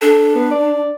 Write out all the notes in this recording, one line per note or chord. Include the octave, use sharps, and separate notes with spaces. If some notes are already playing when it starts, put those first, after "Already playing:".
D4 A4
B3
D5